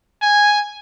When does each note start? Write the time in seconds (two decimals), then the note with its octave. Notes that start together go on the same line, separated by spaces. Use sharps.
0.22 G#5